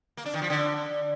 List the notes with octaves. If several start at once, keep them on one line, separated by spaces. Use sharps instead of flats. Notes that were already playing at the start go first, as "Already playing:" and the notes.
A#3
D4
D#3
F3
D3